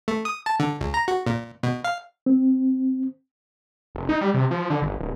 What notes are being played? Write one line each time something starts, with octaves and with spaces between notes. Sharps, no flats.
A3
D#6
A5
D3
C#2
A#5
F#4
A#2
B2
F5
C4
F1
D#4
G3
C3
F3
D3
G1
D1